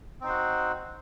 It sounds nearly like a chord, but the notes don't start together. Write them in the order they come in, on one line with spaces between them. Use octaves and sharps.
C4 D#4 C5 F#4